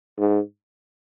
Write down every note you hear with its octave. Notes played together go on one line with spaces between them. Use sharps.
G#2